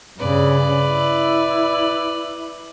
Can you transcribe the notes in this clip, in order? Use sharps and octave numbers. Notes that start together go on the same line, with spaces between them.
G2 C#3 B4 D5
E4